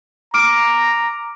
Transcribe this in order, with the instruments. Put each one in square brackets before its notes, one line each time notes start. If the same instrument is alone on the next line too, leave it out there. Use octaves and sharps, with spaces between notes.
[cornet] A#5 [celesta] D6 F6 D7